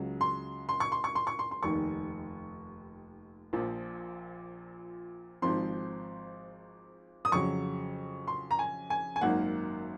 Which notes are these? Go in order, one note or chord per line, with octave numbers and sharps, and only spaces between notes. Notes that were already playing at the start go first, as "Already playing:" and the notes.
Already playing: C#2 C#3 F#3
C6
C6
C#6
C6
C#6
C6
C#6
C6
C6
F1 D#2 D#3 C#6
A#1 A#2 F3
G#1 G#2 F3 C4 C6
D#6
F2 C#3 F#3 C#6
C6
A#5
G#5
G#5
G#5
G#1 F#2 D#3 A#3 F#5